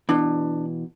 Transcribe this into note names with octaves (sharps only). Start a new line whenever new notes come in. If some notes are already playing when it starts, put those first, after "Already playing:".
B2 E3 D4